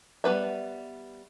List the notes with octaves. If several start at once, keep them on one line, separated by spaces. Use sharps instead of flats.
G3 B3 B4 E5